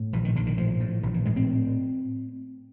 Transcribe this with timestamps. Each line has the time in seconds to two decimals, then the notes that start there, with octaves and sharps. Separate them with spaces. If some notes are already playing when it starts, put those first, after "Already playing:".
Already playing: A2
0.13 A#1 E3
0.25 D#3
0.35 A#1 D3
0.47 D#3
0.57 A2 F3
0.80 A2
1.03 A#1 E3
1.14 E3
1.25 A2 G#3
1.36 C4